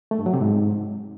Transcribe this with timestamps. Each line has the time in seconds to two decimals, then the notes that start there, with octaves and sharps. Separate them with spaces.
0.11 A3
0.19 G2
0.26 F#3
0.34 C3
0.41 G#2